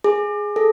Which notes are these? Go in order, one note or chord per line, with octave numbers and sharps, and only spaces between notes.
G#4
A4